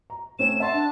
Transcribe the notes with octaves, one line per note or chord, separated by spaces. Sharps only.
A#5
A3 C4 C#4 E7
E5 F#5 A5 C6
D4